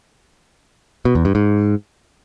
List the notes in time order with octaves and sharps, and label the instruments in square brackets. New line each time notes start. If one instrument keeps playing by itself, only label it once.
[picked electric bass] B2
E2
G2
G#2